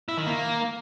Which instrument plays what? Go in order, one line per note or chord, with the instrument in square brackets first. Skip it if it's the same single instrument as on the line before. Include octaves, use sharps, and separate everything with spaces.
[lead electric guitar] E4
D#3
A#3